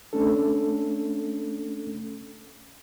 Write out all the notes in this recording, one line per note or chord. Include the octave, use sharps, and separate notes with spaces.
A3 C#4 D4 A4